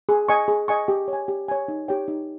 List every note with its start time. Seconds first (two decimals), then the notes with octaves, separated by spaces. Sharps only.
0.09 G#4
0.29 D#5 G#5 C#6
0.48 G#4
0.68 D#5 G#5 C#6
0.88 G4
1.08 C#5
1.13 G#5
1.28 G4
1.48 C#5 G#5
1.68 D#4
1.88 G4 C#5 G5
2.08 D#4